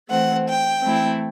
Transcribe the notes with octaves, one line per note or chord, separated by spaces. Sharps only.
E3 A3 C4 F#5
G5
E3 A3 C4 E4